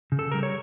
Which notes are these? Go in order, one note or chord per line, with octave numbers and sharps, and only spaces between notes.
C#3
A4
G3 A#4
C#5